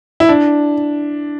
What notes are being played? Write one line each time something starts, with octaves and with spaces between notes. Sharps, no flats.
E4
D4